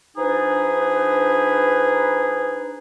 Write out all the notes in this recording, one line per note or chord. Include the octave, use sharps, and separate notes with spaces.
F3 D4 D#4 G#4 B4